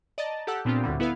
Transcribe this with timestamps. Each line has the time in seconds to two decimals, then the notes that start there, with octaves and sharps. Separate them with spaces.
0.18 D5 D#5 A5 A#5 A6
0.47 G4 A4 F#5 A5 E6 F#6
0.65 A#2 B3 C4 D4 F4 G4
0.83 D2 A2 D3 G3
1.00 B3 E4 B4 E5 F5